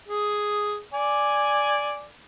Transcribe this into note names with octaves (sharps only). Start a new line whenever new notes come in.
G#4
D5 G#5